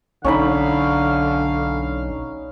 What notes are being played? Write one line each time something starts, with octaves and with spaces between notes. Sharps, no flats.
B1 D3 C#4 D#4 F5 B5